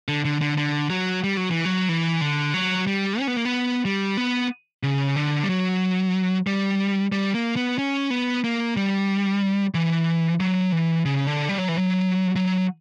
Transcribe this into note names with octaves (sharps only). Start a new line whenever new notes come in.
D3
D3
D3
D3
F#3
G3
F#3
E3
F#3
E3
D3
F#3
G3
C#4
B3
A#3
B3
G3
B3
C#3
D3
G3
F#3
G3
G3
A#3
B3
C#4
B3
A#3
G3
E3
F#3
E3
C#3
D3
G3
F#3
E3
F#3
F#3